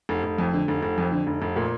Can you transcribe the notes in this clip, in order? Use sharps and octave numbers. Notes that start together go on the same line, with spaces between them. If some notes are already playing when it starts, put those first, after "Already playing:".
F1
F1
F2
D3
F1
F1
F2
D3
F1
F1
A#2